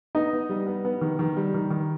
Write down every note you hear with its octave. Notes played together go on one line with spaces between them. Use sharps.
B3 D#4 D#5
B3
G3
B3
B3
D#3
D#3
G3
D#3
D#3